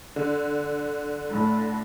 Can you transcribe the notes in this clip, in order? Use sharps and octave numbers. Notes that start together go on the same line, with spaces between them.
D3
A2